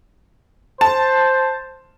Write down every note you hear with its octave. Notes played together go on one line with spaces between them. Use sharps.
C5 A5